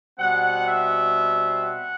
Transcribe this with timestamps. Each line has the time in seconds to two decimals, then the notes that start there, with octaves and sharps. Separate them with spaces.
0.17 B2 G3 C4 F#5
0.66 E5
1.62 F#5